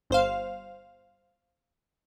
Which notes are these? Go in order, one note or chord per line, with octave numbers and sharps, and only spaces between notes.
G1 C5 F5